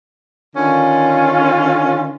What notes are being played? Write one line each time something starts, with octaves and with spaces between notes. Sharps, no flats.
D3 D#3 C#4 F4